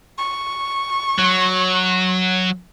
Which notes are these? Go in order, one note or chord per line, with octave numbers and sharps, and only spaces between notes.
C#6
F#3